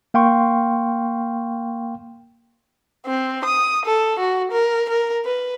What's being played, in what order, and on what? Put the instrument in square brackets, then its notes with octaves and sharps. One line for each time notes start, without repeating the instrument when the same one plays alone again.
[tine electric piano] A#3 F5 G5 C6 C#6
[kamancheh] C4
D#6
A4
F#4
A#4
A#4
B4